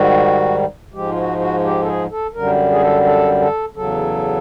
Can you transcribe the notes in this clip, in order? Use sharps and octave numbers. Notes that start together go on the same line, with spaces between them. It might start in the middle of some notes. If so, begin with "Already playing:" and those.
Already playing: G#2 D#3 G3 F#4
G#2 F3 G#3 G4
F4
F#4
F#4
G4
A4
G#4
A4
F#2 D3 G3 A#4
G#4
A4
A4
A4
E2 C#3 F#3 A4